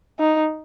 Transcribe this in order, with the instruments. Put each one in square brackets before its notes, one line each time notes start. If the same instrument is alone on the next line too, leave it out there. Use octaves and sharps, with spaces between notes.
[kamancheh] D#4